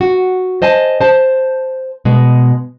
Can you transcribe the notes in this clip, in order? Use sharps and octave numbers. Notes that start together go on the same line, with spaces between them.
F#4
C5 D#5 G#5 A5
C5 A5
B2 G#3